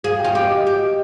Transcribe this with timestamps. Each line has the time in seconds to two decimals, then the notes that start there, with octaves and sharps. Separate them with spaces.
0.04 G#4 F5
0.19 G5
0.24 F4
0.35 G4 F5
0.46 D#5
0.56 D#5
0.67 G4